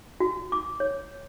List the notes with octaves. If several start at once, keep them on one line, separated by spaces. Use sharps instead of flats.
F#4
D6
C#5